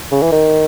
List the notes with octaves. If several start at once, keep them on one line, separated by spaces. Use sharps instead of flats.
C#3
E3
D#3